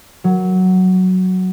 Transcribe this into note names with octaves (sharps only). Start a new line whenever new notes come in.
F#3